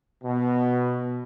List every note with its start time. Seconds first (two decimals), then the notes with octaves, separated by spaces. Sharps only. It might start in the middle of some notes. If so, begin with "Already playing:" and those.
0.24 B2